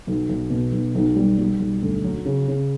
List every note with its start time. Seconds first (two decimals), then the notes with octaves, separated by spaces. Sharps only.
0.07 B1
0.29 B1
0.50 B2
0.72 B1
0.95 B1
1.16 G3
1.39 G3
1.60 B1
1.82 D2
2.04 F#3
2.25 C#3
2.48 C#3